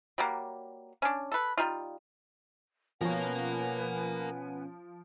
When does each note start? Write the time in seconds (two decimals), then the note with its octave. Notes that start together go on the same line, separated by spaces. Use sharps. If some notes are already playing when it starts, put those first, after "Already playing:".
0.18 F#3 G3 A#3
1.02 C#4 D4
1.32 A4 B4
1.58 G3 D#4 F4
3.01 B2 F3 C#4 A#4 B4 F5 F#5 G#5